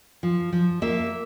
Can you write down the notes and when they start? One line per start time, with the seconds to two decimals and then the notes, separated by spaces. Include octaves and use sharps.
0.23 F3
0.52 F3
0.82 A#3 E5